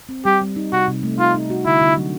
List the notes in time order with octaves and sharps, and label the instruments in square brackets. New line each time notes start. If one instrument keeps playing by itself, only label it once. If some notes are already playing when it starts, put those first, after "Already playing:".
[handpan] C4
[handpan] G3 [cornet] G4
[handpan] G3
D#4
[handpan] C3 [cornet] F#4
[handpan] C3
A3
[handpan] D#4 [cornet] F4
[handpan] D#4
F#4
[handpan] D3 [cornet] E4
[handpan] D3
F#3